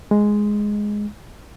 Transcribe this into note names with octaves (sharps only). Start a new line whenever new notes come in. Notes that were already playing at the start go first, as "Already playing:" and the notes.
G#3